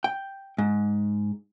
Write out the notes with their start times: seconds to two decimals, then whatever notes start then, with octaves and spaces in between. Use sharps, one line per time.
0.04 G5
0.58 G#2